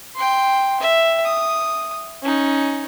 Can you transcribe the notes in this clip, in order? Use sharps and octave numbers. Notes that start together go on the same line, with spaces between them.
G5 C6
E5
D#6
C#4 D#4